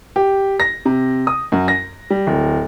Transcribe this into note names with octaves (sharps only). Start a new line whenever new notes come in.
G4
A#6
C3
D#6
F#2
A#6
G3
D1